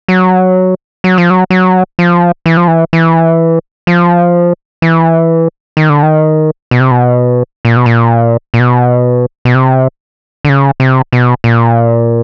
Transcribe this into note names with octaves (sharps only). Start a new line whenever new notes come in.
F#3
F#3
F3
F#3
F#3
F3
E3
F3
E3
E3
F3
E3
D#3
D3
D#3
B2
C3
B2
A#2
B2
A#2
A#2
B2
B2
C3
D3
C#3
C3
B2
A#2